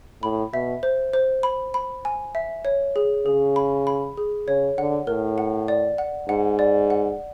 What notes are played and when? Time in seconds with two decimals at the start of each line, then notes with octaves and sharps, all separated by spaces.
0.23 A2 B5
0.53 B2 E5
0.83 C5
1.13 C5
1.43 B5
1.74 B5
2.05 G#5
2.35 E5
2.65 C#5
2.96 G#4
3.26 C#3 G#4
3.56 B5
3.87 B5
4.17 G#4
4.48 C#3 C#5
4.78 D3 F#5
5.07 A2 A#4
5.38 F#5
5.68 D5
5.98 F#5
6.29 G#2 F#5
6.59 D5
6.90 F#5